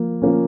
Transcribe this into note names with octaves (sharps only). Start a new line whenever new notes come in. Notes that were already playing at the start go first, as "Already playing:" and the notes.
Already playing: F3 A#3
F3 A#3 C#4